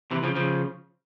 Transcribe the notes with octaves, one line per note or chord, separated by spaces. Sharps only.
C3 E3
C#3 F3
C#3 F3